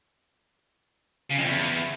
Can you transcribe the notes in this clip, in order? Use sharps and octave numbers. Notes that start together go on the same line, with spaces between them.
C#3
F2
E2